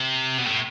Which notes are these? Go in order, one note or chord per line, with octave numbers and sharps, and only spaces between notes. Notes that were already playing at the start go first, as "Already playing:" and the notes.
Already playing: C3
B2
A2